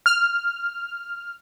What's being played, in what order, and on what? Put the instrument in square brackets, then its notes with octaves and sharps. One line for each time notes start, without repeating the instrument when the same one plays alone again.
[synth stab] F6